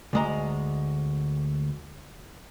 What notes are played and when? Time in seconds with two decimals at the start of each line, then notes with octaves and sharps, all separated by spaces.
0.13 D2 G#3 A#5